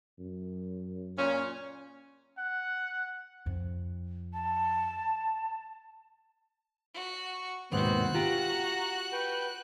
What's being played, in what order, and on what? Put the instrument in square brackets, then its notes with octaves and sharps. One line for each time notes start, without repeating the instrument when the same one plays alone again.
[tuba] F#2
[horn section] A#2 C#4
[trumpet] F#5
[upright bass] F2
[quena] A5
[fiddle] F#4
[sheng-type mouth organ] C#6
[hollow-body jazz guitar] D#2 G#2 B2 [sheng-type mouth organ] B3 C4 [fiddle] F#4 F#6
[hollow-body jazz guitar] F4 G4 [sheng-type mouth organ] A#5
[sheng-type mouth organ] B4 G5